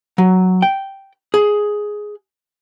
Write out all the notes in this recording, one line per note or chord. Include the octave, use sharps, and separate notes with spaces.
F#3
G5
G#4